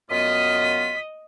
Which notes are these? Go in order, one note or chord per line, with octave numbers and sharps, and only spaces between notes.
F#2 B3 F4 D#5 D#6 B6